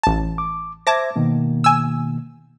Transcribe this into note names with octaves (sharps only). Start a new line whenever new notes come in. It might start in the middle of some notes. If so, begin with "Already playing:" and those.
A1 A5
D6
C5 E5 A5 D6 G#6 A#6
B2 D#3 A#3
G#5 E6